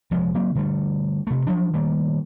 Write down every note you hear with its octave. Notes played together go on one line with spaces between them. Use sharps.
F1 F3 G#3
F#3 A#3 C4
D3 G3 A3
C3 A3
F3 F#3 D4
D#3 G3 A3 A#3